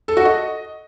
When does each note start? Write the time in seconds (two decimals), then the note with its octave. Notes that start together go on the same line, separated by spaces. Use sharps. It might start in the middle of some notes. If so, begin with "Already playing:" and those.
0.08 A4
0.17 F#4
0.25 D#5